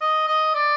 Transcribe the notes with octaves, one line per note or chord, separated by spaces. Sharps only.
D#5
D#5
D5